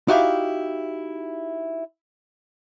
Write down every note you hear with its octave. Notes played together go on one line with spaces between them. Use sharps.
D#4 E4 F#4 G4 E5 F5